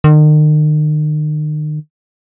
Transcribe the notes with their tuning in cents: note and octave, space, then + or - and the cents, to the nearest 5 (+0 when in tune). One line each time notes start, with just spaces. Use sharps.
D#3 -40